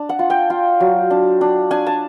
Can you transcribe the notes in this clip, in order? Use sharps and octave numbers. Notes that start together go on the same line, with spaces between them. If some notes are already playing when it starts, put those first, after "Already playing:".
Already playing: D4
F#5
F4
G5
F4
F#3
D4
D4
D4 G#5
A5